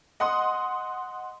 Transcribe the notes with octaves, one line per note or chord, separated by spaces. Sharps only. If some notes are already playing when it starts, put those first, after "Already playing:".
D#5 F#5 C6 D#6